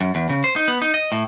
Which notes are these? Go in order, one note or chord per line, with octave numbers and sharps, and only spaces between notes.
F#2
E2
C#3
C5
D#4
B3
D#4
D#5
A2